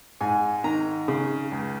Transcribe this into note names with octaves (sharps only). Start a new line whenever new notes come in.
G#2 G#5
D#3 A#5
C#3
C#2